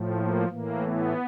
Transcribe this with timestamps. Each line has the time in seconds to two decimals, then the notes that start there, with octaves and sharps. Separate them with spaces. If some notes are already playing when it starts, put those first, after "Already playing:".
Already playing: A2 F3
0.14 A#3
0.48 A2 E3 A#3
0.82 B3